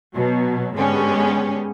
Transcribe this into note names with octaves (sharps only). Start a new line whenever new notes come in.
B2 F#3
G#2 D3 G#3 B3 C#4 G4